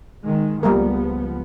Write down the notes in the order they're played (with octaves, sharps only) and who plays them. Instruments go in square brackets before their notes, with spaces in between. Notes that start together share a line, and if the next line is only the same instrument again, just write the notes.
[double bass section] D#3 G#3
[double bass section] C#2 F3 B3 [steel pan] G3 A#3 A#4